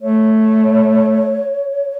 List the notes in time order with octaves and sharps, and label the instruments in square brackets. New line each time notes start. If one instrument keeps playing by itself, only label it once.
[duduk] A3 [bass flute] C#5